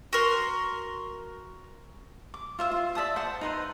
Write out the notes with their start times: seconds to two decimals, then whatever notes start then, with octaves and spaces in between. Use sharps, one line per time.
0.13 F#4 A#4 C6
2.34 D6
2.59 F4 C5 E5
2.72 F4
2.95 D5 E5 A5 D#6
3.16 C5 F#5 A5
3.41 D#4 B4 C6